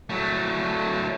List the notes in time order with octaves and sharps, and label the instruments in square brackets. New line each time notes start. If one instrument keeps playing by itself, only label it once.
[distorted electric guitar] F#3 A3